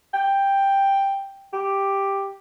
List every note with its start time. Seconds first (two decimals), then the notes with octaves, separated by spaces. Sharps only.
0.14 G5
1.53 G4